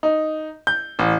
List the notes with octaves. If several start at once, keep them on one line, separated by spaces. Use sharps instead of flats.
D#4
G6
A1